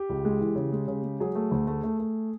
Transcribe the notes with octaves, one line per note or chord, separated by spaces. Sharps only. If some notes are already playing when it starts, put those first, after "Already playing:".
Already playing: G4
C#2
G#3
E3
C#3
G#3
C#3
G#3
F#3 G#4
A3
D2
A3
A3
A3